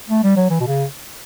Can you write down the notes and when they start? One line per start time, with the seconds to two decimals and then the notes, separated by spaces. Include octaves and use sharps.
0.09 A3
0.24 G3
0.36 F#3
0.50 E3
0.60 B2
0.67 C#3